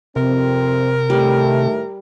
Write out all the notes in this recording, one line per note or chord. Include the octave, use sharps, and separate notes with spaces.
F2 C3 C4 A#4
A2 D#3 G3 A3